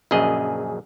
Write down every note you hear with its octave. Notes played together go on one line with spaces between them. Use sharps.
A#1 F#2 C#3 G#4 D#5